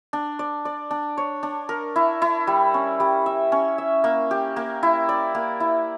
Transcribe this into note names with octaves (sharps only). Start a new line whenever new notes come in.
D4
D5
D5
D4
C#5
D4
A#4
E4
E4
G3
C#4
G3
E5
C#4
E5
A#3
G4
A#3
E4
D5
A#3
E4